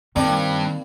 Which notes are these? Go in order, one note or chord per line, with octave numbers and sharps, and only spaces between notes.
G2 D#3 A#3 C4 D5 D6